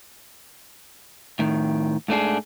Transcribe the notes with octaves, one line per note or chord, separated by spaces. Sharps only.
A2 D#3
G#2 A3 D4 G#4